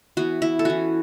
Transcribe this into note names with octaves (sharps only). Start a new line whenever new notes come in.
E3 B3 F#4
E4
A4
E3 C#4 F#4